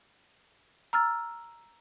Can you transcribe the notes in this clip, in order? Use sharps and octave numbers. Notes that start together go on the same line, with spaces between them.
A#5 E6 F6 A6